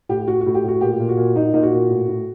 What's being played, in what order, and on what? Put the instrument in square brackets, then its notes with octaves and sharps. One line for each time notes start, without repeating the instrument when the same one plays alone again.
[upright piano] A2 G4
A2 F#4
F#4
A2
G4
A2 F#4
A#2 G4
A#2
F#4
A#2
A#2 D#4
A#2 D#4
F#4
A#2
A2
A2